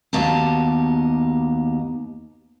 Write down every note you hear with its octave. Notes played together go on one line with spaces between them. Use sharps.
D#2 B2 D#4 G4 A5